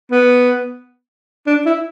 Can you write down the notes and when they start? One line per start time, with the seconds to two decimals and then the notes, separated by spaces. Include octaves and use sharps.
0.11 B3
1.46 D4
1.66 E4